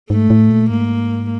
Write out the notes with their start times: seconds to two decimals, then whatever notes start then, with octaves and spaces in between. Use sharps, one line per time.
0.10 G#2 A3
0.30 A2
0.50 A#2
0.70 G#2 A#3